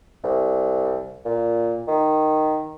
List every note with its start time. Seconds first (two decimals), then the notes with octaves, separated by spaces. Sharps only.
0.24 C2
1.25 A#2
1.88 D#3